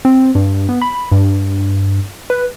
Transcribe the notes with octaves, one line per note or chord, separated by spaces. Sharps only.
C4
G2
B3
B5
G2
B4